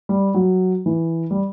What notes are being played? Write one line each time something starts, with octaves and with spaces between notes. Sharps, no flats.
G3
F#3
E3
G3